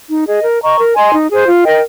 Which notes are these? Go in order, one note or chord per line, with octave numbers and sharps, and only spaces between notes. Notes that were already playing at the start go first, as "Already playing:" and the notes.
D#4
G#4 D#5
A#4
D#5 A#5 C#6
A#4
D#5 G#5 C6
D#4
G#4 C5
F4
A#4 D#5 G5